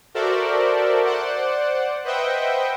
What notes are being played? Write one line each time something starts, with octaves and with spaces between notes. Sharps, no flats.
F#4 A4 A#4 C5 D5 E5
C5 D5 F#5
B4 C5 D#5 E5 F#5 G5